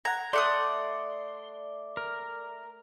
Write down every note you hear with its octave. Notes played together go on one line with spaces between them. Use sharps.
F#5 A#5 G#6
A3 D5 F#5 C6 D6 D#6
A#4